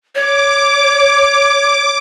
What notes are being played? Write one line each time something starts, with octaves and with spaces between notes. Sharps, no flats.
C#5 D6